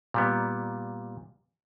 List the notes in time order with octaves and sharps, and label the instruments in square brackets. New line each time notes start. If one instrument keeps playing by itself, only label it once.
[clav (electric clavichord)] A#2 G3 B3